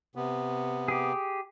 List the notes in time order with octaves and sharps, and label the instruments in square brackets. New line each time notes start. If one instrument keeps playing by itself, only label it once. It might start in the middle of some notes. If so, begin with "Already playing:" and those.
[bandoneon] C3 B3
[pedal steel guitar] G4 G#4